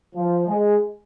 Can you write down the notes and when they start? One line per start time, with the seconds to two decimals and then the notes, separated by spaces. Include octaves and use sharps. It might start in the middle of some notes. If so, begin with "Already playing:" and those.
0.16 F3
0.48 G#3